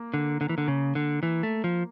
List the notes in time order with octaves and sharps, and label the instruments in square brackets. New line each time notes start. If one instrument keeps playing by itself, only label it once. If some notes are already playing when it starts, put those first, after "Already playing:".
Already playing: [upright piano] A#3
[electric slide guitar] D3
D3
E3
D3
C#3
D3
E3
A3
F3